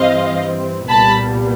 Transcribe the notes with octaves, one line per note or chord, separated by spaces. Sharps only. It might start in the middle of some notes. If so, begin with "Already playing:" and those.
Already playing: G2 E3 G3 C4 D#5 F5
C2 A#2 G3 B3 A5 B5